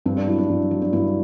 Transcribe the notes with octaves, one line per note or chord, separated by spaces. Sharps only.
G2 C4
D4
F#3 E4
D4
G2
F#3
D4
G2 E4